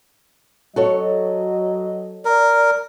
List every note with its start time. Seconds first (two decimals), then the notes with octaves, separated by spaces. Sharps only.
0.76 F#3 F#4 A4 C#5 D#5
2.25 A#4 D5